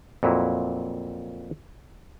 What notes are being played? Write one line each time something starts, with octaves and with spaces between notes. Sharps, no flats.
F2 A#2 F#3 E4